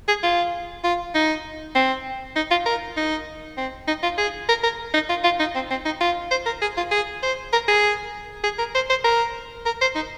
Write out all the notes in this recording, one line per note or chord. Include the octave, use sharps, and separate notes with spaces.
G#4
F4
F4
D#4
C4
D#4
F4
A#4
D#4
C4
D#4
F4
G#4
A#4
A#4
D#4
F4
F4
D#4
C4
C4
D#4
F4
C5
A#4
G#4
F4
G#4
C5
A#4
G#4
G#4
A#4
C5
C5
A#4
A#4
C5
D#4